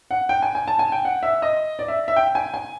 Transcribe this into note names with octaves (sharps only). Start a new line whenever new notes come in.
F#5
G5
G#5
G#5
A5
G#5
G5
F#5
E5
D#5
D5
E5
E5
G5
G#5
G#5